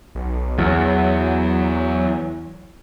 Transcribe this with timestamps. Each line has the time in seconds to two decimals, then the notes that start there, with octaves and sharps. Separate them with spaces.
0.15 B1
0.58 E2 F#3